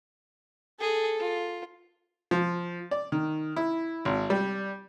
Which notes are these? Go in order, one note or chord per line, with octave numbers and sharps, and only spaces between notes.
G#4 A4
F4
F3
D5
D#3
E4
G#1
G3